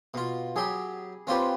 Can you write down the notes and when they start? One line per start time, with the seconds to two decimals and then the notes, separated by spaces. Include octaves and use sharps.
0.14 B2 F4
0.56 F#3 G4 G#4 B5
1.27 C4 C#4 F4 G4 B4